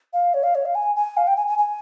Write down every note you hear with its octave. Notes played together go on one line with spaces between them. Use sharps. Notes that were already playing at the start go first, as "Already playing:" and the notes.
F5
C#5
F5
C#5
F5
G#5
G#5
F5
G5
G#5
G#5
G#5